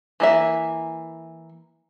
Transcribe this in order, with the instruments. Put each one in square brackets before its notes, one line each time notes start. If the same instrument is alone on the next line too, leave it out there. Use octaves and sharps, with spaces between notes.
[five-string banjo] E3 A#3 E5